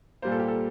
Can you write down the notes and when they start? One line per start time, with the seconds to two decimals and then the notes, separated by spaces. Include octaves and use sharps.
0.22 A#2 G3 A#3 C5
0.32 A4
0.40 G4
0.48 A4